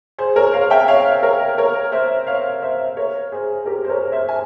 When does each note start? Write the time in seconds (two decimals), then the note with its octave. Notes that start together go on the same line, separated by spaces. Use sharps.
0.18 G#4 C5
0.36 A#4 C#5
0.54 C#5 F5
0.70 E5 G5
0.88 C#5 F5
1.23 A#4 C#5
1.58 A#4 C#5
1.92 C5 E5
2.27 C#5 F5
2.62 C5 E5
2.97 A#4 C#5
3.32 G#4 C5
3.66 G4 A#4
3.84 C5
3.89 A#4 C#5
4.12 C5 E5
4.29 G#5